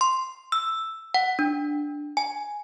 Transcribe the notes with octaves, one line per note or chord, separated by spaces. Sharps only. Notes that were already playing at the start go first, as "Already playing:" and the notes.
C6
E6
F#5
D4
G#5